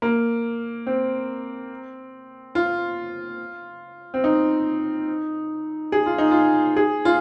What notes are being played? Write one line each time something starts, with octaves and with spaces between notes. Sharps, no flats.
A#3
C4
F4
C4
D#4
G#4
F4
D#4
F4
G#4
F4